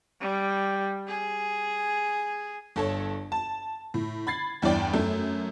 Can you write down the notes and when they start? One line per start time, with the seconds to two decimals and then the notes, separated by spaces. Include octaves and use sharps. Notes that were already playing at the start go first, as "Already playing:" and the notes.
0.20 G3
1.07 G#4
2.76 G1 A4 C#5
3.32 A5
3.94 A2
4.27 B5 G#6 A6 C7
4.62 E2 G2 E4 D5 G5
4.94 F#2 A3